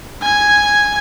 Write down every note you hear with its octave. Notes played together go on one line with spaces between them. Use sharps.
G#5 G#6